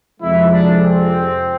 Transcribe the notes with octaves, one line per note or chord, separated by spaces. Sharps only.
F2 C3 F3 G#3 E4
D4
C4